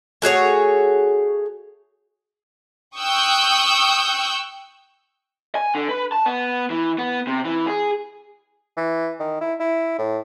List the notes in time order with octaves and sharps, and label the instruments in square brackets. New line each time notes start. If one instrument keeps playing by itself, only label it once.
[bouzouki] A3 F#4 G#4 C#5
[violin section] G5 C#6 D#6 E6 F#6 G6
[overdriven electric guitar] G#5
D3
B4
A5
B3
E3
B3
C3
E3
G#4
[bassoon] E3
D#3
E4
E4
A2